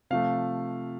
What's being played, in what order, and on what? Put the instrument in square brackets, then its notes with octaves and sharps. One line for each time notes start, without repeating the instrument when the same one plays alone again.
[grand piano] C3 F3 A3 F5